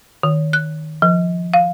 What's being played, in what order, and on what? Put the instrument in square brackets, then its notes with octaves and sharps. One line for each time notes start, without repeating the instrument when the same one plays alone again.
[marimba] D#3
F#6
F3
F5